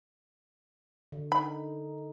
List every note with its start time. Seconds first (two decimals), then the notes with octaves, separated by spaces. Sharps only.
1.12 D3
1.32 D#4 B5